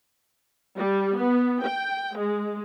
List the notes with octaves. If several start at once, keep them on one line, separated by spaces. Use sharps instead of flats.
G3
B3
G5
G#3